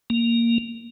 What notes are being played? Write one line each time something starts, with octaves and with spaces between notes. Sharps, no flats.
A#3